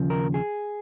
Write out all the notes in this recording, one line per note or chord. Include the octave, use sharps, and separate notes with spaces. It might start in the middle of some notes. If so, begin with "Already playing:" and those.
Already playing: D#2 C#3 F3
A#4
G#4